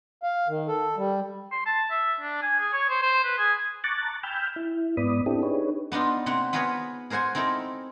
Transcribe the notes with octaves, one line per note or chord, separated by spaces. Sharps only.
F5
D#3
A4
G3
C6
A5
E5
D4
G#5
G#4
C#5
C5
C5
B4
G#4
A5 A#5 C#6 D6 F#6 A6
G5 G#5 B5 E6 F6 G6
E4
G#2 B3 D5 B5 D#6
C4 D4 E4 G4 A4
D4 D#4 G4 G#4 B4 C#5
B3 D4 D#4 F4
C3 A#3 C4 F#5
B3 F4 G#4 A#4 B4 C#5
G#4 A#4 C5 F#5 G#5
C4 D#4 E4 A4 A#4